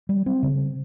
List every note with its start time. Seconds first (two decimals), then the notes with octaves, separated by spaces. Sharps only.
0.09 G3
0.26 C4
0.43 C#3